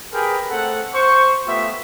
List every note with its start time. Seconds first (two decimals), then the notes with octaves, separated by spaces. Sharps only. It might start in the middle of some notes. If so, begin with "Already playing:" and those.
0.14 G4 G#4 A#4 B4 G5 B5
0.50 A3 C4 A4 F#5
0.94 C5 C#6
1.47 A3 B3 F4 G4 E5